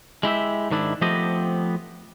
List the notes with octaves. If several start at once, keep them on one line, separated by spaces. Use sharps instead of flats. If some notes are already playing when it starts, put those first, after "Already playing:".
G#3 E4 G4 E5
G#2 D#3 D4 E4
F3 A3 B3 C4 G4 D#5